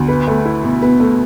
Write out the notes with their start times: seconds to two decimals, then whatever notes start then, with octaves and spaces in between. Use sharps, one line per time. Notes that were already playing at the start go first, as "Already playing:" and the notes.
Already playing: D2 B3
0.08 B4
0.27 A3
0.45 E4
0.64 B2
0.82 B3 B4
1.00 A3